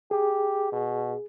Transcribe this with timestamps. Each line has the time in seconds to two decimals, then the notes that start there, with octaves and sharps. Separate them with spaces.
0.11 G4 G#4
0.72 B2